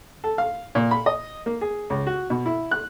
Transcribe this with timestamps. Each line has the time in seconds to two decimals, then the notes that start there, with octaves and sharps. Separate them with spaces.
0.24 A4
0.38 F5
0.75 A#2
0.91 B5
1.06 D#5
1.46 A#3
1.61 G#4
1.90 C#2
2.07 F#4
2.30 B2
2.46 E4
2.71 F#6